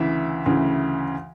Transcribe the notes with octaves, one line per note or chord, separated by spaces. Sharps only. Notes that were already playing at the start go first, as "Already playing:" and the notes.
Already playing: D2 C#3 E3 E5
D2 C#3 E3